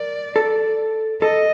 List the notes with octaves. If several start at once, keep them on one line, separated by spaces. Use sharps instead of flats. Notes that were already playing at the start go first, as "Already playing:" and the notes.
Already playing: A#4 D5
A4
A4 D#5